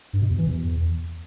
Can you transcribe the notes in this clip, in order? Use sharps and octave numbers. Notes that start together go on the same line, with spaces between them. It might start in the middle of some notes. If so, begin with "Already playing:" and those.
G2
B2
E2
E3
E2